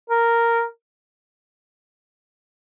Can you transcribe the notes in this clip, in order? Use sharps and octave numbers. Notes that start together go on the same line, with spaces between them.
A#4